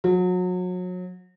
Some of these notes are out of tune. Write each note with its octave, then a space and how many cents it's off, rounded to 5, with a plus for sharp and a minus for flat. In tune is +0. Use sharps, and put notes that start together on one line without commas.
F#3 -30